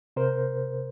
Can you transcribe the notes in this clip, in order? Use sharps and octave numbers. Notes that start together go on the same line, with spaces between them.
C3 A#4 C5